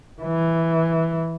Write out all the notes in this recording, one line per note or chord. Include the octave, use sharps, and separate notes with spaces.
E3